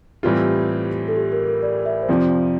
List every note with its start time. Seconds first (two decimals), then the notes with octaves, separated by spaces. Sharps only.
0.23 A2 E3 G3 C4 F4 G4
1.08 A4
1.16 G4
1.32 A#4
1.47 A#4
1.63 D5
1.85 E5
2.03 C5
2.09 F2 C3 F3 D5